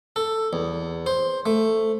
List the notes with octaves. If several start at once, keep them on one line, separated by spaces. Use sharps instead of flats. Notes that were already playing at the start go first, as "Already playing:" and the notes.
A4
E2
C5
A3